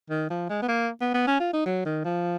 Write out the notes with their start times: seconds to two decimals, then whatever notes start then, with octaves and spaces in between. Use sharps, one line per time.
0.10 D#3
0.30 F3
0.49 G#3
0.62 B3
0.69 A#3
1.01 B3
1.14 B3
1.27 C#4
1.40 F4
1.53 D#4
1.66 F#3
1.85 D#3
2.05 F3